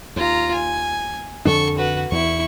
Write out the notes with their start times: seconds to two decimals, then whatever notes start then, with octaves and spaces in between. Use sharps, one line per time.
0.16 D#2 F4 A#5
0.54 G#5
1.45 F2 D3 D4 A4 C#6
1.78 F#4 B4
2.12 E2 E4 C#6